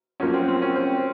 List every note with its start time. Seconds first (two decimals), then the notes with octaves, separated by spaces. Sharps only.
0.20 F#2 F3 A#3 C#4
0.34 C4
0.48 C4
0.62 C#4
0.76 C4